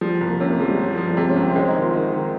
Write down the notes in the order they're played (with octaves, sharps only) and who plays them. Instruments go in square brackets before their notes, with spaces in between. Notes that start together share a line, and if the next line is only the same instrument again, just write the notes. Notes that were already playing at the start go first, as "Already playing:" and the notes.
[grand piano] F3 [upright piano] G3
[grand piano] C2
[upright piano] A#3
[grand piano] C3 [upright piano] C#4
[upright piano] A#3
[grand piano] F3 [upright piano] G#3
[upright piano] G3
[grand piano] F3
F3
[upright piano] G3
[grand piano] C3 [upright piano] G#3
[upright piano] C#4
[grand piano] C2
[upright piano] C4
[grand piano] G#3 [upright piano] C4
[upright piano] D#4
[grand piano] D#3
[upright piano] F4
[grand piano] D#3
D#3